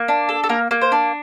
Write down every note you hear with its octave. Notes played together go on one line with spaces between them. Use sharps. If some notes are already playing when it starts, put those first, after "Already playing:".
Already playing: A#3
D4
A4
A4
A#3 A#4
A#3
C5
D4